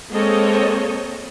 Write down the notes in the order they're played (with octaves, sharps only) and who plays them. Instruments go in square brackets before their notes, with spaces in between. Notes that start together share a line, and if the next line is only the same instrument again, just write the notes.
[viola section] G#3 A#3 C4 A4 C#5 D#5